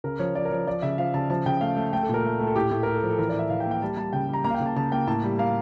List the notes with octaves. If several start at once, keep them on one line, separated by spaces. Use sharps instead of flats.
C#3 A#4
F3 C#5
F3 D5
A#4
F3 C#5
F3 D5
C#3 E5
F3 F5
C#3 A5
F3 A5
C#3 G5
A3 F5
A3
A3 G5
A4
A#2 A#4
A3
A3
A4
A2 G4
A2 A4
A2 A#4
A4
F3
A4
E3 A#4
D5
A2 E5
E3 F5
G5
A#3
G5
G3 A5
G3 A5
C#3 G5
G3
A#5
A#3 A#5
F5
G5
C#3
A5
C#3 A5
A#3 G5
A2 A5
G3
A#3 F5